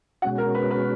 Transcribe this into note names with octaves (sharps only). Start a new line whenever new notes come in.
B2 G#3 C#4 F#4 F#5
A#4
B4
B4